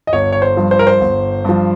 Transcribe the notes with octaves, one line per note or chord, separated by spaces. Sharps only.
D#5
G1 C#5
C#5
C5
G2 F3
C5
A#4
C5
G1
G2 F3